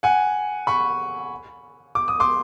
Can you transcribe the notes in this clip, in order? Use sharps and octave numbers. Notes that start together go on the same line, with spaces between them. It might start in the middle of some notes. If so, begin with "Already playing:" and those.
F#5 G#5
B5 C#6
D6
D#6
C6 D6